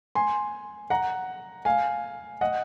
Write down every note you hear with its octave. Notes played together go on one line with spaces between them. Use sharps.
G#5 C6
F#5 A#5
F5 G#5
D#5 F#5